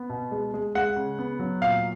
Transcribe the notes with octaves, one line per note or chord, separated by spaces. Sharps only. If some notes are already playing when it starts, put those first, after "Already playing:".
Already playing: B3
B2
G#3
G#3
G#3 F#5
C#3
B3
F#3
A#2 F5